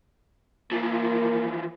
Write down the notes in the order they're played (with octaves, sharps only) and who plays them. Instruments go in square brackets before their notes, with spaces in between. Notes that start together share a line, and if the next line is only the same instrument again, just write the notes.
[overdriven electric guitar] E3 F3 [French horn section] A#3